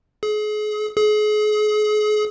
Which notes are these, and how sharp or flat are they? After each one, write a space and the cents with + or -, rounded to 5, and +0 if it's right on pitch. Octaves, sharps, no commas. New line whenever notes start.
G#4 +35
G#4 +35